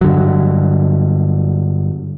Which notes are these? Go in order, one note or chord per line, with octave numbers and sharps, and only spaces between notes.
G2 D3 F#3